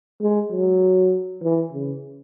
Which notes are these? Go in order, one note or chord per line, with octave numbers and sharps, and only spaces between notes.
G#3
F#3
E3
C#3